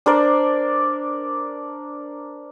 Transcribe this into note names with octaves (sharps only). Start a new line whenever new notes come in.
D4 A#4 C5 D5